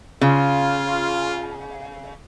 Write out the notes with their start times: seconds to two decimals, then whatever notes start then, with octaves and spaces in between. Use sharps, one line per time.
0.21 C#3 F4